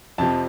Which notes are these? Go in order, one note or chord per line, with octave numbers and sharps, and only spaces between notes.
F2 C3 F3 A5